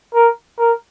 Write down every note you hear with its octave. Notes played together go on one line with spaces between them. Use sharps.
A#4
A#4